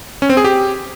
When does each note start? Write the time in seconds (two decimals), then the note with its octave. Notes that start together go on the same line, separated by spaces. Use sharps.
0.22 C#4
0.30 C4
0.37 G#4
0.45 G4